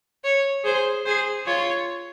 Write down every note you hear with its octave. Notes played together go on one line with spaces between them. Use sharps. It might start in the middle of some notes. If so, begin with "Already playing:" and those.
C#5
G#4 C5
G#4 C5
F4 C#5